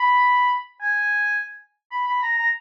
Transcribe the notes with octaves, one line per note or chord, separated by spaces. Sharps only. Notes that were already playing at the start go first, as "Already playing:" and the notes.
Already playing: B5
G#5
B5
B5
A#5
A#5